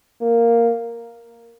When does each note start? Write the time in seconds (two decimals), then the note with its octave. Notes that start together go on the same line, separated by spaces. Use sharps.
0.21 A#3